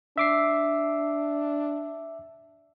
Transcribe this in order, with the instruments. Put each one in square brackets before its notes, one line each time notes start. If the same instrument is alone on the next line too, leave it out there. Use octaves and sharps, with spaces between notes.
[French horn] D4 [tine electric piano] E5 D6 C7